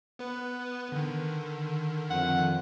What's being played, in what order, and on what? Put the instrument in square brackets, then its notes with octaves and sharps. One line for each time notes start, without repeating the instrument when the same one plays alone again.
[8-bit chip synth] B3 B4
D3 D#3
[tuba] F2 [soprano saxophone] F#5